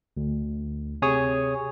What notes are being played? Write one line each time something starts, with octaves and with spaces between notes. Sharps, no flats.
D2
C3 G#4 C#5 D#6